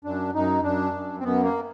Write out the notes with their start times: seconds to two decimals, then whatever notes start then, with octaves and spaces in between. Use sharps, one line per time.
0.04 F#2 D4
0.34 F#2 D#4
0.63 F#2 D4
0.94 F#2
1.19 C4
1.23 F#2 B3
1.43 A#3